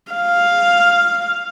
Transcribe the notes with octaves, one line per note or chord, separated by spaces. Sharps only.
F5